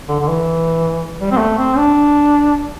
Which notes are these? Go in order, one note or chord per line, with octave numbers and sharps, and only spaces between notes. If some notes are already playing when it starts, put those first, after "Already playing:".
D3
D3
E3
G3
C4
A3
C4
D4